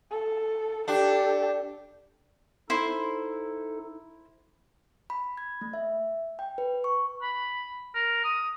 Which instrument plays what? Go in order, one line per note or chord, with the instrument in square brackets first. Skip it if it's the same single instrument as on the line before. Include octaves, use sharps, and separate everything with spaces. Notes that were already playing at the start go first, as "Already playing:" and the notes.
[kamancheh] A4
[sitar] D4 [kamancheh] G4 A4
[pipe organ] D#4 A4 [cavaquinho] E4 C5
[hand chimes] B5
G#6
A3
E5
G5
B4
C#6
[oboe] B5
A#4
D#6